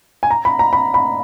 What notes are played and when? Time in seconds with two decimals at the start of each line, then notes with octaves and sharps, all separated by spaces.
0.23 G#5
0.31 A#5
0.45 B5
0.59 A#5
0.73 B5
0.94 B5